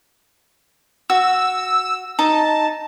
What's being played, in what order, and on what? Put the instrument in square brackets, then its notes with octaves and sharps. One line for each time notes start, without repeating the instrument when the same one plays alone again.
[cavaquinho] F#4 [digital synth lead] E6
[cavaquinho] D#4 [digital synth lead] A5